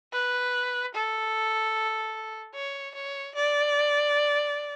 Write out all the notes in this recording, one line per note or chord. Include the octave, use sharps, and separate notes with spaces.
B4
A4
C#5
C#5
D5